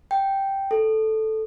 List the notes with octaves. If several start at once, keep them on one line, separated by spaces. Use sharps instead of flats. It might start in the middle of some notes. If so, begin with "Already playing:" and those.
G5
A4